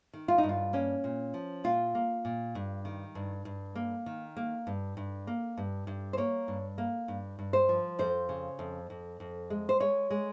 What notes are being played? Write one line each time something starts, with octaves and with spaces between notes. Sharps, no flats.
D#3
F4
D#4
G2
F4
A#3 C#4
A#2
F3
A#2 F4
A#3
A#2
G2
D#3
G2
G2
A#3
D#3
A#3
G2
G2
A#3
G2
G2
C5
A#3 C#5
G2
A#3
G2
G2
C5
F3
F2 C5
C#3
F2
F2
F2
G#3
C5
G#3 C#5
G#3